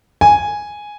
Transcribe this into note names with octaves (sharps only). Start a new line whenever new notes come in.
G#5